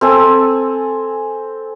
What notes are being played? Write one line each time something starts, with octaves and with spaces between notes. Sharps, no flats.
C4 A4 G#5